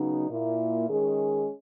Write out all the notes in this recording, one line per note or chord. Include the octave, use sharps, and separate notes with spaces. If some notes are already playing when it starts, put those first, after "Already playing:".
Already playing: C#3 F#3 B3 D#4
A#2 A#3 E4
D#3 G#3 C#4 G#4